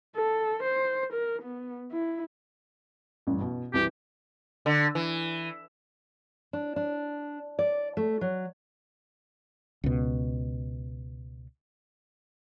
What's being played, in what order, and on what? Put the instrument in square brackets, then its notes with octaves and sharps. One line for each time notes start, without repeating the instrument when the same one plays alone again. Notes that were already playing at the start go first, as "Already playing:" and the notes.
[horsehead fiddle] A4
C5
A#4
B3
E4
[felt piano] A1 G2
B2
[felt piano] C2 E3 [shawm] G4
[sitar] D3
E3
[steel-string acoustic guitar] D4
D4
D5
A3
F#3
[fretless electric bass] C#2 B2